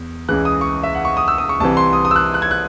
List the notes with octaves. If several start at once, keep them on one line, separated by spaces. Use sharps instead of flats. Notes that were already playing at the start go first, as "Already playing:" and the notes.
Already playing: E2
C#2 C#3 E3 G#3 F#6
D#6
C#6
E5
F#5
C#6
D#6
E6
D#6
C#6
C2 C3 E3 A5
C6
D#6
D#6
E6
F#6
F#6
G#6
F#6